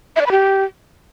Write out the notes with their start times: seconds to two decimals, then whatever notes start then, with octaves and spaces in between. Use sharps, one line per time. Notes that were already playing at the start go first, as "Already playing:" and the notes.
0.16 E5
0.21 D5
0.26 B5
0.31 G4